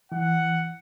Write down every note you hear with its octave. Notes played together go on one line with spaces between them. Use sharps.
E3 F#5